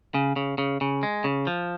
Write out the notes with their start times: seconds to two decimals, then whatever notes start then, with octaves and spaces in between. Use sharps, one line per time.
0.14 C#3
0.36 C#3
0.58 C#3
0.81 C#3
1.03 G#3
1.24 C#3
1.47 F3